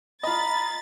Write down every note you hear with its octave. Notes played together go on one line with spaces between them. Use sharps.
F4 D#5 A#5 B5 A6